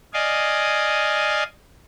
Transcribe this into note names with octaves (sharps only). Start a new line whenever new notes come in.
D5 D#5 F5 G#5